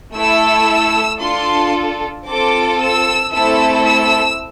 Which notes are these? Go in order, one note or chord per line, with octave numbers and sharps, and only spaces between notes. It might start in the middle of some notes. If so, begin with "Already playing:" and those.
A3 E4 A4 E6
D4 F4 A4 C6
C4 F4 A4 D6
E6
A3 C4 E4 A4 E6
E6